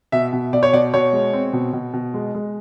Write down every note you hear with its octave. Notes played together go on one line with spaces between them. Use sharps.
B2 E5
B2
B2 D5
C#5
B2 D5
B2 C#5
G#3
C4
B2
B2
B2
G#3
G#3